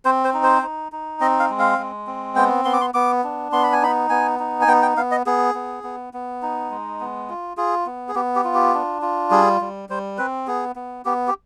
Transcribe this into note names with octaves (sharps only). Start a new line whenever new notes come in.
C4 C5
C5
D#4
C5
D#4
D#4
C4 D#5
F5
G#3
F5
G#3
C4
B3 G5
B3 C6
D6
C6
B3 D6
D4
B3 C6
B5
G#5
D#4 B5
B3 G#5
D#4
G#5
B3 G5
G5
B3 F5
D#5
B3 G#4
B3
B3
B3
D#4
G#3
B3
F4
F4 G#4
B3
G#4
B3 G4
G4
F4
G4
D4
F4
G3 G#4
G3
G3 C5
C4 B4
B3 G#4
B3
B3 G4
G4